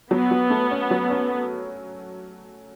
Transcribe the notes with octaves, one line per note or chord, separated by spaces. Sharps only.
F#3 B3
F#3
A3
C#4
F#3
C#4